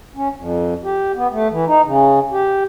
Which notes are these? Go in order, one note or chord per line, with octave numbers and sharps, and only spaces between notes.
C#4
F2
G4
B3
A3
E3
D#4
C#3
G4